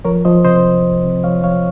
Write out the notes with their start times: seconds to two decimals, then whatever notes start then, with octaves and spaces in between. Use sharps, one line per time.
0.05 F3 A#4 C#5
0.25 F3 C5 D#5
0.44 C3 C5 D#5
0.64 C2
0.84 C2
1.04 C3
1.24 F3 C#5 F5
1.43 F3 C#5 F5